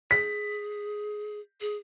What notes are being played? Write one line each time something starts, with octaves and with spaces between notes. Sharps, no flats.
G#4 B6
G#4